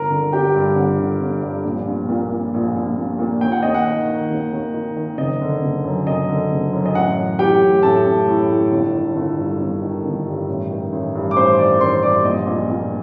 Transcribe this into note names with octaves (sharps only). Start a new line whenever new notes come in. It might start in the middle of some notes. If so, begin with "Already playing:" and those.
Already playing: G1 A#4 A#5
D3
G1 G4 G5
G2
G1 F#5
D3
G1
G2
A#1
A#1
A#2
A#2
A#1
A#1
A#2
A#2
D#2 G5
F#5
D#2 D#5
F#5
D#3
D#3
D#2
D#2
D#3
D#3
F#1 D#5
D3
F#1
F#2
F#1 D#5
D3
F#1
F#2
D#5
A1 F#5
A1
A2 G4 G5
A2
A1 A4 A5
A1
A2
A2
G1
D#3
G1
G2
G1
D#3
G1
G2
A1
D#3
A1
G2
D6
A1 C5 C6
D#3 D5 D6
A1 C5 C6
G2 D5 D6
A#1 D#5
A#1
A#2